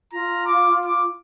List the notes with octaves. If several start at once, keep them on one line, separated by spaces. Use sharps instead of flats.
F4 A#5
D6
D6